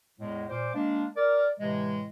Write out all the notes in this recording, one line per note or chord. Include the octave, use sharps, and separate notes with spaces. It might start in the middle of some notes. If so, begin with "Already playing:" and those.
E2 A2 G#3
A#2 C5 D6
G#3 A#3 D4
A#4 D5
A2 C3 E3 G#3